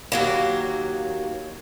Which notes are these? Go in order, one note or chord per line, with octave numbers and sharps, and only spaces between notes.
D#2 F#3 A#3